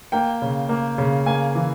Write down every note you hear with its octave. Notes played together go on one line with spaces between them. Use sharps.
A#3 G5
C#3
A#3
C#3
A#3 G#5
E3